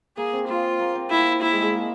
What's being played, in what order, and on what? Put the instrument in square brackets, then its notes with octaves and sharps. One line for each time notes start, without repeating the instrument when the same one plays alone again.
[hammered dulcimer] A#3 [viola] G#4
[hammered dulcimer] C4
[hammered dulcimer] A#3 [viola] F4
[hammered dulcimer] A#3
C4
[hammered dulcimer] A#3 [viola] E4
[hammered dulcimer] A#3 [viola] E4
[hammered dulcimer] G#3
G#3
A#3